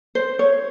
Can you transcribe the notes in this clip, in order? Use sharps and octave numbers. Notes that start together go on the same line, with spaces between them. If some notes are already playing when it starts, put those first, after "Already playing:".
C5
C#5